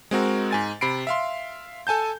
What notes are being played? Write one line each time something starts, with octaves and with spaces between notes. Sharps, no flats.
G#3 C4 F#4 A#4
G#2 G#5 A6
C3 B5 C7 D7
E5 F5 C6
A4 G#5 A5 G6